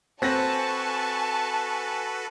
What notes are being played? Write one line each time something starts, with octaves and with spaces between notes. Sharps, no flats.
C4 F#4 A4 B4 G#5 A5 C#6 A#6